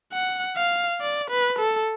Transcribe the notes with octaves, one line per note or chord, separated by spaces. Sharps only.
F#5
F5
D5
B4
A4